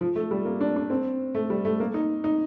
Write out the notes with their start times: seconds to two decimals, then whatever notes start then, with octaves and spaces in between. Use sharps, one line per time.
0.01 F3
0.15 A3
0.31 G3
0.45 A#3
0.60 D4
0.76 D4
0.90 C4
1.35 A3
1.50 G3
1.65 A3
1.80 A#3
1.94 D#4
2.24 D#4